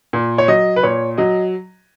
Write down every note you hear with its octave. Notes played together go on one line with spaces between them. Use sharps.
A#2
C#5
F#3 D#5
B4
A#2 C#5
F#3 D#5